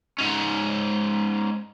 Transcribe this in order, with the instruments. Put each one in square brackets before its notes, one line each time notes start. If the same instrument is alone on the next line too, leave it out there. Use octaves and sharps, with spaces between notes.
[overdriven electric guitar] G#2 C#4